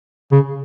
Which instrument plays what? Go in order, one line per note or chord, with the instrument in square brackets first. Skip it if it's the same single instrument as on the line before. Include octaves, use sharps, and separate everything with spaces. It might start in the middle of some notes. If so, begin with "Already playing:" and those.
[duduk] C#3